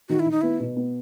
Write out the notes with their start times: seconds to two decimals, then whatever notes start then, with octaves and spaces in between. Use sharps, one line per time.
0.09 D#3 F#4
0.20 E4
0.26 D#3
0.31 D#4
0.41 B3 E4
0.60 B2
0.77 B3